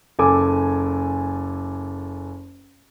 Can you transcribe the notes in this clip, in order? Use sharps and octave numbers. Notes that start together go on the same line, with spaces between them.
F#1 A4 G#5 D6